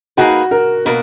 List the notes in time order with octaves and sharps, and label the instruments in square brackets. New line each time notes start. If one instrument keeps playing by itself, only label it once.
[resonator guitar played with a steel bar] A#3 D#4 G#4 B4 [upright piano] F#4
[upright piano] A#4
[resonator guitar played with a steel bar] B2 A#3 [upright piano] A#4